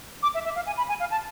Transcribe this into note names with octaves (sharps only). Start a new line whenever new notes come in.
D6
E5
E5
F5
G#5
B5
G#5
F5
A5